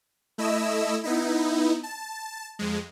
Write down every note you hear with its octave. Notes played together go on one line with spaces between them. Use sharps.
A3 E4 D#5 E6
B3 D#4 E4
A5
F2 G#3